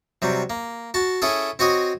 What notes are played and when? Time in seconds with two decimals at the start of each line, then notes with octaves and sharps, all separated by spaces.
0.22 C3 F#3 G3
0.50 A#3
0.94 F#4 A5
1.22 C#4 E4 G#4 A4
1.59 C4 F#4 C#5 D#5